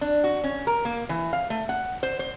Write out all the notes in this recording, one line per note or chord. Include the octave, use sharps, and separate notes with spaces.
D4
F#4
C#4
A#4
A#3
E3
F5
A3
F#5
C5
C5